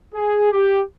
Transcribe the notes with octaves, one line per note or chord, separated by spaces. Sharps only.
G#4
G4